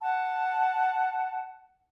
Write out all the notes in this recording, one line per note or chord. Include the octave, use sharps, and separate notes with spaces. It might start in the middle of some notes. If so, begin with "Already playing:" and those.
F#5 A5